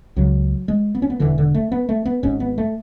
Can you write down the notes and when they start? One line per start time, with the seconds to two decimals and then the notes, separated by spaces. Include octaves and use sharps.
0.16 C#2 C#3 F#3
0.68 G#3
0.95 B3
1.02 C#4
1.10 B3
1.20 E1 D2 D3 E3
1.38 D3
1.54 A3
1.72 B3
1.89 A3
2.05 B3
2.23 G#1 G#2 C#4
2.40 B3
2.58 A3